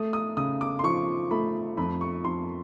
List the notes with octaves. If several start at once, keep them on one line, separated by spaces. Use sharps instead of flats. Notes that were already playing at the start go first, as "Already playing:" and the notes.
Already playing: A3 D#6
D#6
C#3 D#6
D6
C6
F3 C#6
A3 B5
F2 B5
C#6
F2 C6